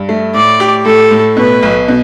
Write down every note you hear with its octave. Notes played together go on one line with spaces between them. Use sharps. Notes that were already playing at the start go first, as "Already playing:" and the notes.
Already playing: G2
A3
A2 D5
G4
A2 A4
A2
B2 B4
B1
B2